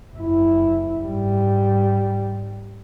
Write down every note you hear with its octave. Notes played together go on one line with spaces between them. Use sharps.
F#1 E4
G#2 G3